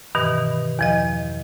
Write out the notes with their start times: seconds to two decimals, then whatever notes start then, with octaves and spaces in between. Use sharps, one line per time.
0.15 G2 B2 D#3 E3
0.79 E2 F3 D#5